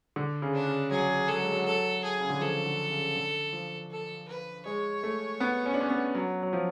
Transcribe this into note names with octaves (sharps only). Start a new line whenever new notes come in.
D3
C#3
D4
C#3
F#3 G#4
F#3 A4
G#3
F#3
A4
G#4
C#3
D3
F3 A4
D3
C#3
D3
F3
A4
B4
G#3 C#5
A3
B3
C#4
D4
C#4
B3
F#3
F#3
F3